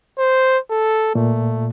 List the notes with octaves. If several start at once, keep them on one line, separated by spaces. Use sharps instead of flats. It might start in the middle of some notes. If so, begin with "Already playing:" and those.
C5
A4
A#2 A3